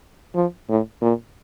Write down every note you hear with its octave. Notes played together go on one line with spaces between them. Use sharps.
F3
A2
A#2